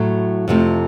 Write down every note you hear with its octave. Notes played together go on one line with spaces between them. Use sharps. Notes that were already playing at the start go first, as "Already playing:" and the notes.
Already playing: A2 F#3 A3
F2 C3 F3 A3